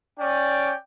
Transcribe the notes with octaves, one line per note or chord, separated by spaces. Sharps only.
C#4 D5 G5